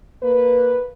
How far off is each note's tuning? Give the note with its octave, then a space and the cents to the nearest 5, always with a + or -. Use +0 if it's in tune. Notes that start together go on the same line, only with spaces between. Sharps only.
A#3 +0 B4 +0